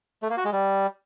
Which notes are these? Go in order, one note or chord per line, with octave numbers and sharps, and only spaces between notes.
A3
A#3
F#4
G#3
G3